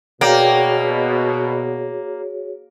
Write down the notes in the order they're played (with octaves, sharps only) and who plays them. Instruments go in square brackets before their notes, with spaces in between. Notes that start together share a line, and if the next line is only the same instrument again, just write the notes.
[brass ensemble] B2 [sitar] A#3 [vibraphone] F#4 G#4 C#5 [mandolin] D5 G5